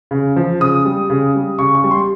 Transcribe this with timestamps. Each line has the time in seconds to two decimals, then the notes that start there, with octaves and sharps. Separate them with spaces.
0.11 C#3
0.36 F3
0.60 C#3 D#6
0.85 G3
1.10 C#3
1.35 G3
1.58 C#3 C#6
1.75 C#6
1.84 G3
1.91 C6